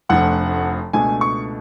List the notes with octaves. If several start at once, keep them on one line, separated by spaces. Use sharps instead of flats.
F1 F2 F3 A3 D4 F#5
C#2 B2 A3 D4 G#5
C#6